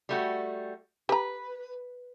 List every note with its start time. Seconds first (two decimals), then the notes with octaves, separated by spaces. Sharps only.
0.09 G3 A3 F#4
1.09 G4 B4 A#5